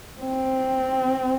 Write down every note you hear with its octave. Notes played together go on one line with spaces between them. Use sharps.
C4